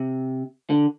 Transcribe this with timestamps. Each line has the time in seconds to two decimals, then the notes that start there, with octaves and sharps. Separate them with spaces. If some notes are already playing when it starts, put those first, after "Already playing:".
Already playing: C3
0.70 D3